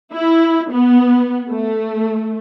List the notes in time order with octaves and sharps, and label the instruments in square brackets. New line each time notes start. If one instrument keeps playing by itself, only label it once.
[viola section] E4
B3
A3